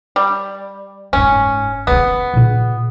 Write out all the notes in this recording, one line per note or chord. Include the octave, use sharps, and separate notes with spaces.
G3
F#1 G#2 C#4
C#3 B3 C#4
A#2 C#3